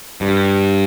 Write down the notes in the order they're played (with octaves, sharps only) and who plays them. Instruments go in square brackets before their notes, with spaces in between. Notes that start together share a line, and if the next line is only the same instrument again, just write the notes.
[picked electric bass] G2